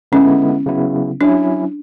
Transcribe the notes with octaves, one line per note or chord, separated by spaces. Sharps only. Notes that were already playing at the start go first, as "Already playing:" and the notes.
D3 G#3 B3 C#4 E4
C#3 F#3 B3 E4
F#3 C#4 D4 E4